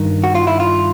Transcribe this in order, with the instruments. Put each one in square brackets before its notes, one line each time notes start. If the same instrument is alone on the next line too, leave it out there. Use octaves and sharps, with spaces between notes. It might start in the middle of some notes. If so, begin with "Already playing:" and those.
Already playing: [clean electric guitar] G2 D#3
F#4
F4
E4
F4